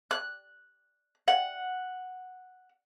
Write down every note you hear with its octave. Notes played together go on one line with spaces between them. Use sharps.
F#6
F#5